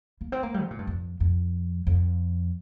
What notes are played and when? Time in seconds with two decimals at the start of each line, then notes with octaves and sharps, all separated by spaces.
0.21 A#3
0.32 C4
0.43 A#3
0.54 G3
0.62 C3
0.71 A#2
0.79 G2
0.87 F2
1.20 F2
1.87 F2